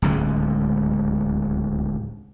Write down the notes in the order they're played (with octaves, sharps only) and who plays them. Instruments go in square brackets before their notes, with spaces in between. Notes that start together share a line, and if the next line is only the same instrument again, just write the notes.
[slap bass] D1 C#2 G#3